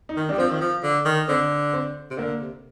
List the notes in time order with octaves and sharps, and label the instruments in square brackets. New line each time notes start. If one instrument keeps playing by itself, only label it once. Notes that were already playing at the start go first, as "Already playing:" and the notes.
[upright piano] D#4
[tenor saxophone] D#3
[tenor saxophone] G3 [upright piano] D4
[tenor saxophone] F3 [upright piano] C4
[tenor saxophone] D#3
F3
D3
D#3
[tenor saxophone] D3 [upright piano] C4
[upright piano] C4
[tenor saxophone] C3
[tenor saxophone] D3 [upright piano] A#3
[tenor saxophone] C3